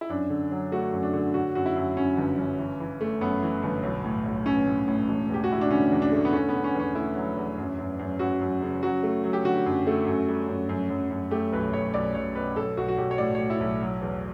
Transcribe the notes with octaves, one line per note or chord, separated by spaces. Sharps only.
E4
F#2 D4
D3
F#3
A3 F#4
F#2
D4
D3
D3 F#4
F#2 F#4
E4
F#2
F#2 C#4
G1
G1
E3
E3
A3
F#2 B3
E3
G1
B1
A2
B1
B1 C#4
A2
A2
E1
E2 G4
F#4
E1 E4
D4
D3 C#4
E2
D4
A3
B3
D3 C#4
B3
D3
C#4
E2
C#4
A3 E4
F#3
E2
F#2
F#2
F#2
F#2 F#4
F#2
C#3
F#3 F#4
A3
F#3
G4
D3 F#4
F#2
A3
F#2
G3
F#2
F#2
F#2
F#2
A3 G4
B1 B4
B1 C#5
B1 D5
B1 C#5
B2 B4
B1 A4
B1 F#4
F#4
B1 G4
C#5
A2 D5
A2 C#5
E4
B1
F#3
E2